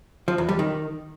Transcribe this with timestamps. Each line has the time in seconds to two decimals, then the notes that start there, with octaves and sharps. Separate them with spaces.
0.28 F3
0.38 E2
0.49 G3
0.59 D#3